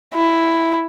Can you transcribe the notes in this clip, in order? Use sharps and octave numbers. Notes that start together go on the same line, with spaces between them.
E4